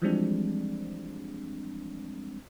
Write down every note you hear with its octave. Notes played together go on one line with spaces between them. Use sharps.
E3 F3 G3 G#3 C4 D4